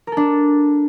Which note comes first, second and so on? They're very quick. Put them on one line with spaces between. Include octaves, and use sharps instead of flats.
A#4 A4 D4